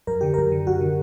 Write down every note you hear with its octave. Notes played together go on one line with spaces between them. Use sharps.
F#2 A#4
D3 G4
F#2 A#4
D3
F#2 F#4
D3